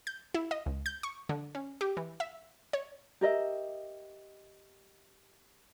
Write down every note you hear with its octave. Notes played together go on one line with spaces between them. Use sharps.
G6
E4
D#5
C#2
G6
C#6
D3
C#4
G4
E3
E5
C#5
G4 A#4 D#5 E5